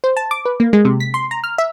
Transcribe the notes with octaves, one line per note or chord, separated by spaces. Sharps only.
C5
A5
D6
B4
A#3
G#3
C3
B6
C6
A#5
F6
E5